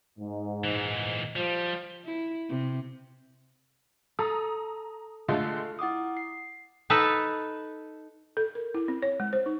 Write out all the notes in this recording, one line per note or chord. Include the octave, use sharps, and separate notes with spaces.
G#2
A#2 E3
F3 G3
E4
C3
A4 A#5 D#6
D3 G#3 A3 F4 A4
E4 F#5 D6 D#6
C7
D#4 A4 B4
A4
A#4
E4
C4
C#5
G#3
C5
D#4